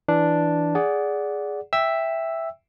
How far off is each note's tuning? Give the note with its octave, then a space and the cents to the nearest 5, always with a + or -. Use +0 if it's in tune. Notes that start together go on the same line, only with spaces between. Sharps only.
E3 +0 D4 +0
G#4 +0 D5 -15 F#5 +0
E5 +0 G5 +10 E6 +0